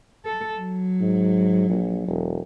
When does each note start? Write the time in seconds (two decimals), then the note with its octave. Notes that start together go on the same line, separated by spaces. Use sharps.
0.25 A4
0.59 F#3
1.00 G#2
1.69 A#1
2.08 E1